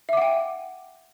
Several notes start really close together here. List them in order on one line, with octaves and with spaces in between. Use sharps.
E5 D6 F#5 G5